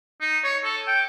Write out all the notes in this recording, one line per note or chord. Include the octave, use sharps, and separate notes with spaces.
D#4
C#5
A4
G5